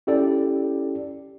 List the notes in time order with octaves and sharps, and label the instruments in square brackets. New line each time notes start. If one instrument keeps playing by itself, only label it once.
[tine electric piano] C#4 E4 G4 A4 D5